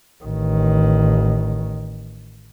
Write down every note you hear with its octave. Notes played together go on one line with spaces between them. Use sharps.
A1 D#3